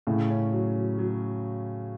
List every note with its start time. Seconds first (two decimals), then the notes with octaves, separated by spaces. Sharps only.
0.07 A2 C#3
0.30 C#4
0.53 F#3
0.76 F#3
0.98 F#3